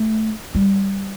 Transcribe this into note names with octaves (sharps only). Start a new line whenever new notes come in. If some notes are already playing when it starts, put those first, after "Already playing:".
Already playing: A3
G3